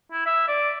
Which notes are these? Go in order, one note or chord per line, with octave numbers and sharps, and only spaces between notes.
E4
E5
D5